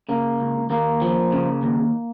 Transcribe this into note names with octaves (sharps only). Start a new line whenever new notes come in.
C#3 A#3
C#2
D#2 A#3
F3
C#3
D#2